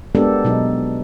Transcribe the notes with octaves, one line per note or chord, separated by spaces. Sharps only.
G#3 A#3 B3 D4 G4 A4
B2 F#3 D#4